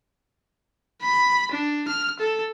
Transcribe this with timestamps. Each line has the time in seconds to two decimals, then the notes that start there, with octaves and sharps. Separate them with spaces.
1.02 B5
1.52 D4
1.88 F6
2.20 A4